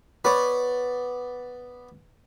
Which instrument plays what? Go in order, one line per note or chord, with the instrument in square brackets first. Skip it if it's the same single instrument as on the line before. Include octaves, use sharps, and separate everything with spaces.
[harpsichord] B3 D5 [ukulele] B4 C#5